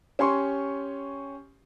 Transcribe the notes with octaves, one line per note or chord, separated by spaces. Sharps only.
C#4 G4 G#5 C6 C#6